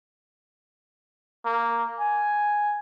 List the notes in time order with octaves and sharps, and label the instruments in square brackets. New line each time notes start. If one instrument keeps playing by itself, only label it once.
[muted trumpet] A#3
G#5